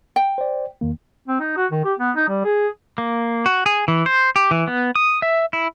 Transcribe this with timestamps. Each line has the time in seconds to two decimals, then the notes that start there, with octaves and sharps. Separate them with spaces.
0.16 G5
0.38 C5 D5
0.81 E2 D#3 A#3
1.28 C4
1.40 D#4
1.57 F#4
1.71 D#3
1.85 G4
1.99 B3
2.16 D#4
2.29 G3
2.45 G#4
2.98 A#3
3.46 F#4
3.66 G#4
3.88 E3
4.06 C5
4.36 G4
4.51 E3
4.68 B3
4.95 D#6
5.22 E5
5.53 E4